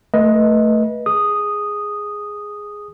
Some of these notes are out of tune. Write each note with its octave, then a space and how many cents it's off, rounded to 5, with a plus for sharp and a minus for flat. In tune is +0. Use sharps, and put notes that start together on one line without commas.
A3 +15 B4 -25 D#5 +10
G#4 +0 D#6 -5